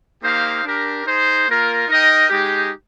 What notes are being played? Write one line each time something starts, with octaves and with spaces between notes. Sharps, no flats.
A#3 D#4 G4 C5 F5
D4 G4 A#4
D#4 G#4 C5
A#3 F4 A#4
D#4 A#4 D#5 G5
G#3 D#4 G4